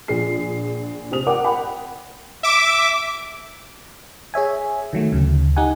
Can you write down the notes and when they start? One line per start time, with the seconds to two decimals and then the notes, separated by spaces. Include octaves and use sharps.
0.08 A#1 G#4 C7
1.11 C3 G4 C5 D#6 F7
1.26 A#4 D5 F#5 G5 D6
1.44 A#4 F#5 G5 B5
2.43 E5 D6
4.34 G#4 C#5 E5 G#5
4.93 D#3 F#3 A3
5.12 D2 C#3
5.56 D#4 G4 F#5 G#5